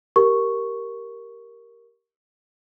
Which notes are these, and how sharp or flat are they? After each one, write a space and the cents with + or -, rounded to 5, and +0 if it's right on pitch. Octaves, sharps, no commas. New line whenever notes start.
G4 +0 A#4 +0 C#6 +0